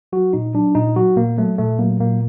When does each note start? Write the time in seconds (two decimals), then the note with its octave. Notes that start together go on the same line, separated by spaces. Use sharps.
0.13 F#3 F#4
0.33 A#2 D#4
0.54 F#3 D4
0.75 A#2 D#4
0.96 F#3 F#4
1.16 A#2 A#3
1.38 F#3 A3
1.58 A#2 A3
1.79 F#3 A#3
2.00 A#2 A#3